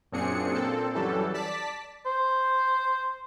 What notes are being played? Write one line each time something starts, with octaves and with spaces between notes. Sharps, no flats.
F#2 A#2 C4 D4 G#4 C#7
A#2 C4 A4
F#2 E3 F#3 G3 A4
D5 A5 B6
C5